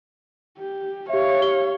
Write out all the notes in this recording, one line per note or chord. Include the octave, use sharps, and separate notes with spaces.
G4
G4 C#5 E5 F5
G4 G7